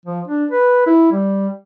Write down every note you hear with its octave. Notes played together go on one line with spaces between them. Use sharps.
F3
D4
B4
E4
G3